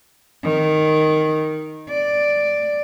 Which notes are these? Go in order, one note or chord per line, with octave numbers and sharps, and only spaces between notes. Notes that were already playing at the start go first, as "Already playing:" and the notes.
D#3
D5